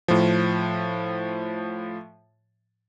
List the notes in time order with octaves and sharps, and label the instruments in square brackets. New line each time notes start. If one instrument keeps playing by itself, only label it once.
[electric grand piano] A2 F3